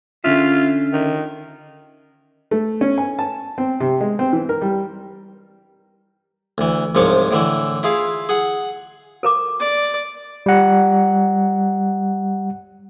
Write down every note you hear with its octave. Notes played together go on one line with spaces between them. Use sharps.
D3 C#4 F4 E5
D#3
A3
C#4
G#5
A5
C4
C3
G#3
C4
E3
A#4
G3
D2 E3
C2 G#2 F3 C#5 D6
A2 D3 E3
E4 F4 G#4 F5
G#4 F#5
A4 A#4 D6
D5
G3 F#5